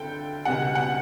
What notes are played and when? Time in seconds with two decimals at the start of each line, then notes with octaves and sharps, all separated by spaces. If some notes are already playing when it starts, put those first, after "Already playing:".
Already playing: D2 D3 A4 G5
0.45 C#2 B2 G3 F#5
0.75 F#5